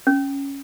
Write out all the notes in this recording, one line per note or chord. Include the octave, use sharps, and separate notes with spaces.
C#4